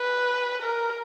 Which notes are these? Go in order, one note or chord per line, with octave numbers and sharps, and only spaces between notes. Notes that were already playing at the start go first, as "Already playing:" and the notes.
Already playing: B4
A#4